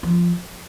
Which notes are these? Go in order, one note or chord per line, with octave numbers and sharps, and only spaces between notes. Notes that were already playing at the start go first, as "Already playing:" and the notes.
F3